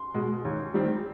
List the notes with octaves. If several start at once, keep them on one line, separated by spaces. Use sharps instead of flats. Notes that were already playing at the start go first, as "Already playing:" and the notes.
Already playing: C6
B2 G#3
D#2
D#3 G3 C4